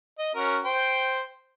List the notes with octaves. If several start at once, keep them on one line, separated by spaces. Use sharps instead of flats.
D#5
C#4 F#4 A#4
C5 G5